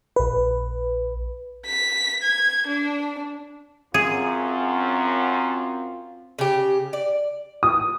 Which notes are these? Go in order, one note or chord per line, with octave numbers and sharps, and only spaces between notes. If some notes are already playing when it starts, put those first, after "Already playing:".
A#1 B4
B6
G#6
D4
F#2 C4 F4 G#4
C#3 G4
D5
D#6